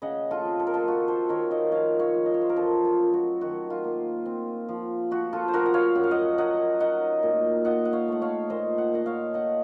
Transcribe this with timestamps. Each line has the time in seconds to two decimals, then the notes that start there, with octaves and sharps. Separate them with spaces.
0.02 C#3 D#5 F#5
0.31 F4 A4
0.45 C4
0.60 A4
0.67 A#4
0.74 F4 A4
0.88 F4 F#4
1.08 A4 C5
1.29 D#3 A#4 C#5
1.51 C5 D#5
1.71 F3 C#5 F5
2.00 C#5 F5
2.14 F3
2.26 D#5
2.34 C#5
2.41 C5
2.49 A#4
2.56 F#2 F4 A4
2.85 F4
2.99 F#2
3.14 F#4
3.41 D#3 F#4
3.70 F4
3.84 A#3
4.26 C4
4.69 F3
5.11 F3 F#4
5.33 F4 A4
5.48 C5
5.53 F3 F#4 A#4
5.66 F#5
5.74 C#5 F5
5.95 F#2 F#5
6.04 F5
6.11 D#5 F#5
6.38 F#3 D#5 F#5
6.80 D#4 D#5 F#5
7.23 A#2
7.64 F4 D#5 F#5
7.85 F#5
7.93 C#5 F5
8.08 A3 F#5
8.22 C#5 F5
8.50 A#2 C5 D#5
8.78 F#5
8.92 A#2 D#5 F#5
9.06 C#5 F5
9.34 D#4 D#5 F#5